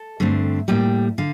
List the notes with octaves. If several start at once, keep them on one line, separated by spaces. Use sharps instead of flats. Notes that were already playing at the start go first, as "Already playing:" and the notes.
Already playing: A4
G2 D3 A3 C4
A2 G3 A#3 G5
D3 F5